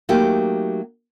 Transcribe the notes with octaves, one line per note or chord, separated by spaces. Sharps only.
F#3 A3 A#3 D#4 G4